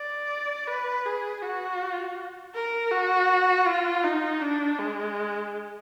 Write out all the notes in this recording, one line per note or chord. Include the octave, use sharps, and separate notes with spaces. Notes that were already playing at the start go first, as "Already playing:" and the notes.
Already playing: D5
B4
G#4
F#4
A#4
F#4
F4
D#4
D4
G#3